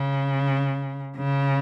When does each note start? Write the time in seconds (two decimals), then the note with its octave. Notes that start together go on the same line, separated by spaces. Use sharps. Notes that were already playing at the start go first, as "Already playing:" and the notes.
Already playing: C#3
1.16 C#3